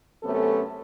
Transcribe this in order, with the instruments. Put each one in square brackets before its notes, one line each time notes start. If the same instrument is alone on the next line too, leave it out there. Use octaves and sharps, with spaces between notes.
[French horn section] F#2 C3 A3 B3 C#4 A4